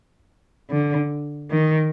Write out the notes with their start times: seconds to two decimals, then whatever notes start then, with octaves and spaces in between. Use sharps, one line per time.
0.71 D3
1.51 D#3